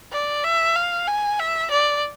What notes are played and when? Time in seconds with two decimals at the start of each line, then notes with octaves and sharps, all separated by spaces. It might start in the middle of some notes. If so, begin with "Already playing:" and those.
0.12 D5
0.44 E5
0.75 F5
1.07 G#5
1.39 E5
1.71 D5